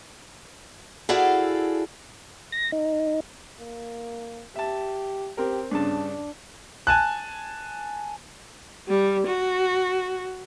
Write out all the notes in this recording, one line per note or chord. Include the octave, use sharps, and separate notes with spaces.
E4 F#4 G#4 A4 D5 F5
A#6
D#4
A#3
G4 E5 A5
C4 G4 A#4
G2 C#3 D4 A5
G#5 A5 F#6
G3
F#4